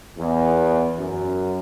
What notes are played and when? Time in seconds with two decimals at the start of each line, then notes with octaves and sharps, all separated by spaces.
0.17 E2
0.99 F#2